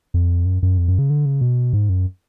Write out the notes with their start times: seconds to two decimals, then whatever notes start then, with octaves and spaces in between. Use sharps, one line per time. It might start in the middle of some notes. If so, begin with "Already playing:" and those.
0.14 F2
0.45 F#2
0.62 F#2
0.78 F2
0.88 F#2
0.99 C#3
1.10 D3
1.26 C#3
1.41 B2
1.73 G#2
1.89 F#2